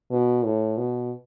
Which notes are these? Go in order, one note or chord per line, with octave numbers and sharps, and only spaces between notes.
B2
A2
B2